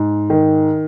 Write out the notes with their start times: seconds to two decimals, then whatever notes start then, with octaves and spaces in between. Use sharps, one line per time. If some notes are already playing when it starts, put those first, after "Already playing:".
Already playing: G#2
0.30 D#3